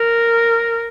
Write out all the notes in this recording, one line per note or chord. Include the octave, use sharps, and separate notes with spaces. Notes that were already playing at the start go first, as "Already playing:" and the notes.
Already playing: A#4